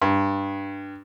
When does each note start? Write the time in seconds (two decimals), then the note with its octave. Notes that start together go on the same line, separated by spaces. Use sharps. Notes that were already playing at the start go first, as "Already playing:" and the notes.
0.02 G2